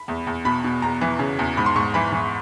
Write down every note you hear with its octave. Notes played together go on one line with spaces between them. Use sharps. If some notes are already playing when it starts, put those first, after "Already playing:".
Already playing: B5
E2
E2
B2 B5
B2
E2 A#5
E3
C#3
E2
G#2 B5
C6
G#2 C#6
E3 B5
E3